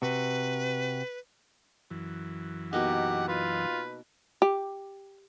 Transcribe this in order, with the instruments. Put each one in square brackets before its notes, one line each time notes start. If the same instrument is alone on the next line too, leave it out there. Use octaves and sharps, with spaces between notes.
[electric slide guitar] C3 F#4 [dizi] B4
[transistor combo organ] F#2 E3
[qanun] B2 A#3 D#4 [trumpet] G4 [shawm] F#5
[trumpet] F4 [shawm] B4
[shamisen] G4